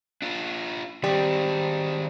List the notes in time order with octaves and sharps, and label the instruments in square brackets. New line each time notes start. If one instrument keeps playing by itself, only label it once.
[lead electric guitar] D4 F4
[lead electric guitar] D#3 C4 [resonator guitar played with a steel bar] G3